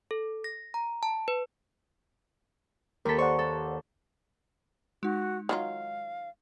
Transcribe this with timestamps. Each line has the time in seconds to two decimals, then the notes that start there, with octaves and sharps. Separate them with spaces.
0.11 A4
0.44 A#6
0.74 A#5
1.03 A5
1.28 B4
3.05 D#2 A4 A#4 B6
3.18 C5 D5 F#5 C#6
3.39 A4
5.03 G#3 D#4 F#4
5.49 D#3 F#3 F4 F5